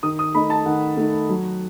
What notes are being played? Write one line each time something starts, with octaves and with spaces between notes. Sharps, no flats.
D#3 D#6
D#6
A3 D#4 B5
A5
D#3 F#5
A3 D#4
F#3